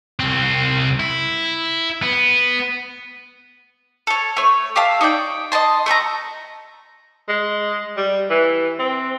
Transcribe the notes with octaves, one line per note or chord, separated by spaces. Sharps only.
C2 C4
E4
B3
A4 C#5
A3 C#5
G4 E5 F5 A5
D#4 C#5 D5 G5
D#5 G5 A5 C6
A3 A4 E5 A#5
G#3
G3
E3
C4